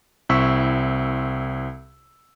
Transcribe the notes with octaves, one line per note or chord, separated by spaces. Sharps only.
C2 C4 E4 C#6 E6 B6